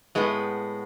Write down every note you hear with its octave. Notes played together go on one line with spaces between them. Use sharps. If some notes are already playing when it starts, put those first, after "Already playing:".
A2 G#3 B3